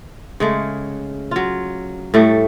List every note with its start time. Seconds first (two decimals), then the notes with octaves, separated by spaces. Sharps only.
0.40 C#3 G#3 A3
1.31 F#3 F4
2.14 A2 G3 A3